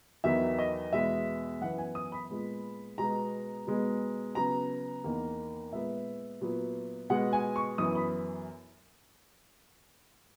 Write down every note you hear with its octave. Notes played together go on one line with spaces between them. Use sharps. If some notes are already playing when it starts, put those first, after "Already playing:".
E2 D#3 F#3 B3 E5
D#5
E2 B2 G#3 B3 E5
F#2 E3 B3 F#5
G#5
D#6
B5
A#2 G#3 B3
B2 G#3 B3 A#5
B2 G#3 B3
C#3 F#3 B3 A#5
E2 D#3 A#3
A#2 G#3 B3 E5
A#2 F#3 B3
B2 G#3 B3 F#5
G#5
C#6
F#2 E3 B3 D#6
B5